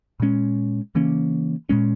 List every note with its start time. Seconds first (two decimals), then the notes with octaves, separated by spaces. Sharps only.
0.20 A#2 G#3 C#4
0.95 C#3 E3 A#3 C#4
1.69 A#2 G#3 C#4